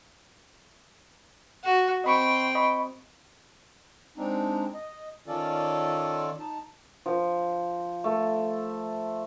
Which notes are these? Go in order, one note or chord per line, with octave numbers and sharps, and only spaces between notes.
F#4
C4 D#5 G5 B5 C#6
D#5 B5 C#6
G#3 C4 D4 D#4
D#5
D#3 C#4 F4 A4 D5
D#4 A5
F3
A3